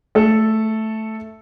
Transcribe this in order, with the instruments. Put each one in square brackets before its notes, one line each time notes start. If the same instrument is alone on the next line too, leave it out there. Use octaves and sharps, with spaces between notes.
[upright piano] A3 A4